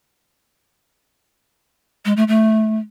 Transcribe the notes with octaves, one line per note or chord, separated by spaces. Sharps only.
G#3
A3
A3